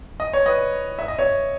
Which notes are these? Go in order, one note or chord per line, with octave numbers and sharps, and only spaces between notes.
D#5
C#5
B4 D#5
E5
D#5
C#5 E5